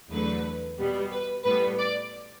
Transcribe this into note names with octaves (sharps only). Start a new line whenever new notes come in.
E2 D3 F#3 A3 B4
B2 G3 B3
B4
A2 G3 B3 B4
D5